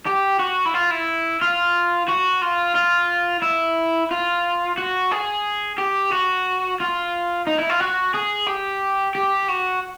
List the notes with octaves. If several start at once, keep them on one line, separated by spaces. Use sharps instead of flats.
G4
F#4
E4
F4
E4
F4
F#4
F4
F4
E4
F4
F#4
G#4
G4
F#4
F4
D#4
E4
F4
F#4
G#4
G4
G4
F#4